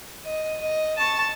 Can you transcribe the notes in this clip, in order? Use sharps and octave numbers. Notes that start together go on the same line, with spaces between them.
D#5
D#5
A5 C#6